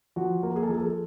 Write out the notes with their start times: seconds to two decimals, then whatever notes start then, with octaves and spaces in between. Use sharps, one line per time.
0.16 F3 F#4
0.43 A#3
0.56 G#4
0.63 A4
0.69 F3 G#4
0.78 A4
0.84 G#4